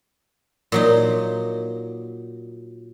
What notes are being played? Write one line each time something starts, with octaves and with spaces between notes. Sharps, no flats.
A#2 F#3 D#4